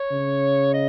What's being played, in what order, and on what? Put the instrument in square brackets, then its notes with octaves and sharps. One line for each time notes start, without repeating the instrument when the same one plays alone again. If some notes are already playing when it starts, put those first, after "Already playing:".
Already playing: [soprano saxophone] C#5
[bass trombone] C#3
[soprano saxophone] D#5